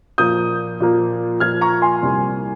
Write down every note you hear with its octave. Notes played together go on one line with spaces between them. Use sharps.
A#2 F3 A#3 D#6 G6
A#2 F3 A#3
A#2 F3 A#3 F6 G#6
A#5 C#6
G#5 C6
C2 C3 G3 A#3